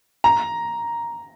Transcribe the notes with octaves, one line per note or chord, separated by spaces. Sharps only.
A#5